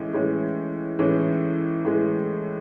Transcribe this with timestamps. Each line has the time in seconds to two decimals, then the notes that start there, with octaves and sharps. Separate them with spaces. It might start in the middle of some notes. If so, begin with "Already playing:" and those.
Already playing: A2 E3 G#3 C#4
0.13 A2 E3 G#3 C#4
0.99 A2 E3 G#3 C#4
1.85 A2 E3 G#3